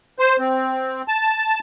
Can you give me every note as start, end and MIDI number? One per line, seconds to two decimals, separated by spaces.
0.19 0.37 72
0.39 1.02 60
1.08 1.59 81